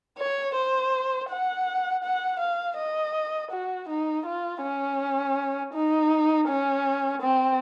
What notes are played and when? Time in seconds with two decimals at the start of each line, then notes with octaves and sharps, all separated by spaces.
0.19 C#5
0.55 C5
1.30 F#5
2.04 F#5
2.40 F5
2.78 D#5
3.51 F#4
3.89 D#4
4.26 F4
4.63 C#4
5.74 D#4
6.49 C#4
7.22 C4